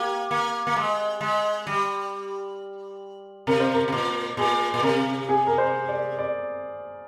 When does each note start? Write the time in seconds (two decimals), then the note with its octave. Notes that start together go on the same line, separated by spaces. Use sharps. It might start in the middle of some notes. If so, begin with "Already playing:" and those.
Already playing: A#3 G4
0.31 A#3
0.67 A#3
0.76 G#3
1.21 G#3
1.67 G3
3.47 C3 A#4
3.60 C5
3.74 A#4
3.88 C3
3.92 A#2
4.37 A#2 G#4
4.74 A#2
4.83 C3 A#4
5.29 G#4
5.47 A#4
5.58 C5
5.88 D5
6.19 D5